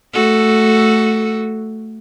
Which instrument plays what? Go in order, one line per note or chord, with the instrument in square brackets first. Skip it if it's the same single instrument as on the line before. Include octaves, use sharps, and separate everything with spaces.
[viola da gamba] A3 F#4 A4